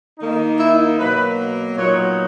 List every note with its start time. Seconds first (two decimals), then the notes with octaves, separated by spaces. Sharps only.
0.19 D#3 A#3 D#4
0.59 E4
0.98 B2 F#3 A#3 B4
1.78 A#2 F#3 B3 D#4 C#5